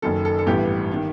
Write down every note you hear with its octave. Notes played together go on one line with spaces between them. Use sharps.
F#1 F#2 D#3 A4
A4
A4
A1 G2 E3 B3 G4
D#3